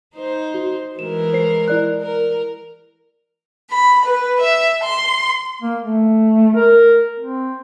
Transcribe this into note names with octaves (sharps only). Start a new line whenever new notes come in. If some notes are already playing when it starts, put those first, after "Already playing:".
D#4 C5
F#4
E3 G#3 A#4 E7
C5 C7
E4 D5 F#6
A#4
B5
B4
E5
C6
A#3
A3
A#4
C4